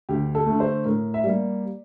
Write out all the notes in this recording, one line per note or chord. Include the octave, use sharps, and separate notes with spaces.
D2 G4
A4
D3 A3
C5
A2 A#4
E5
G3 A#3 D5